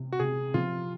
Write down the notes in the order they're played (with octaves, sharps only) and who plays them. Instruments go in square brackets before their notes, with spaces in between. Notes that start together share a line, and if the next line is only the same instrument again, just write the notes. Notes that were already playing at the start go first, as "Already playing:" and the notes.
Already playing: [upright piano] C3
[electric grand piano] F#4
[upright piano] C3 [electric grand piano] G#4
[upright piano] F3 [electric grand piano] F4